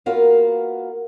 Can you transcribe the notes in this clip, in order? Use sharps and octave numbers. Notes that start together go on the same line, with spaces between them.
A#3 B3 F4 F#4 A#4 F5